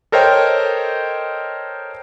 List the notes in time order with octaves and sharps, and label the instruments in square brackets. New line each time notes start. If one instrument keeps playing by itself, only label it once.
[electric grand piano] A4 A#4 C5 C#5 D#5 G5